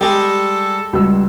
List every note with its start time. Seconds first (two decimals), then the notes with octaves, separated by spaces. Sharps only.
0.01 G3 G#3 A4 G5
0.93 C#2 G3 F#4 E6